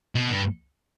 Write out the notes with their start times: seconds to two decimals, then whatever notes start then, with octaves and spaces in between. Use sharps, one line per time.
0.15 B2
0.30 G2